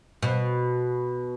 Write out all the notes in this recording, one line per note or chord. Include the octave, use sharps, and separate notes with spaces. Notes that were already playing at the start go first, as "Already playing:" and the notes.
B2